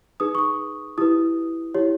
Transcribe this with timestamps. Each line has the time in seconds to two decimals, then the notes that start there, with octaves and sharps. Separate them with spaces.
0.20 D#4 G#4 B4 D#6
0.35 C#6
0.39 D#6
0.98 E4 G4 B4 D#6
1.74 E4 G4 C#5